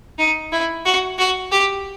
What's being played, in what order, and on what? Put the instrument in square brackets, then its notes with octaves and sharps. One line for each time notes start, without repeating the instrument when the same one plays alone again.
[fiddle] D#4
E4
F#4
F#4
G4